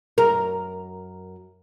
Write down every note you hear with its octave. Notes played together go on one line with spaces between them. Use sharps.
F#2 A#4